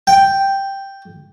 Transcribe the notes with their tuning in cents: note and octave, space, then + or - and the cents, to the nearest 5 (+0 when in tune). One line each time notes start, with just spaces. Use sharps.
G5 +0